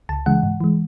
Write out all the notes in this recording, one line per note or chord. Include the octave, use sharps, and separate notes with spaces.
C#2 A5
C#3 E3 G#3 F#5
G#2
E3 G#3